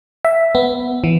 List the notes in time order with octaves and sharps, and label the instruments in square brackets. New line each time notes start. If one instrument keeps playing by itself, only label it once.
[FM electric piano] E5
B3
E3